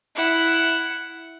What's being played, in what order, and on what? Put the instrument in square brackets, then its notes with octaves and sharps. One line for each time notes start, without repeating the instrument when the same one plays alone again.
[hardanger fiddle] E4 F#5